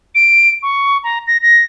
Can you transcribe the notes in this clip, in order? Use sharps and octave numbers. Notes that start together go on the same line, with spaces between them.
D7
C#6
A#5
A#6
A#6